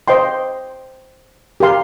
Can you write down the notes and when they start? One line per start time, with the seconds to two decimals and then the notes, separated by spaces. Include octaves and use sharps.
0.08 C5 D#5 G5 C6
1.60 G4 A#4 F5 C6